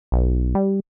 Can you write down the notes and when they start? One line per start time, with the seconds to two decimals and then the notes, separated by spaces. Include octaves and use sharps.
0.12 B1
0.55 G3